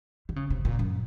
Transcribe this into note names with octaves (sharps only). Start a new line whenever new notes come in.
D#3
C#3
C3
A#2
F#2